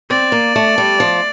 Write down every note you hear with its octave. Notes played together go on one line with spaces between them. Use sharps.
C4 D5
A#3
A3
G3
F3